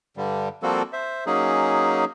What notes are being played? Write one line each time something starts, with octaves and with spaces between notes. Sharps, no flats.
G2 D3 G3
F3 G3 A#3 C4 F#4 A4
C5 E5
F#3 A#3 C#4 D#4 G#4